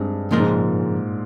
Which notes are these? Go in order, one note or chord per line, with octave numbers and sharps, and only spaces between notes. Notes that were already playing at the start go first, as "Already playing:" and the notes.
Already playing: G2 G#3 C4 D#4
A#2 C#3 F3 G#3 D#4 A#4
G#2